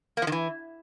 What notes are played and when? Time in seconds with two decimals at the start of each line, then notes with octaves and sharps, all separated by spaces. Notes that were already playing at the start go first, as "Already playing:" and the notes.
0.17 A#3
0.22 F3
0.27 D#3
0.32 E3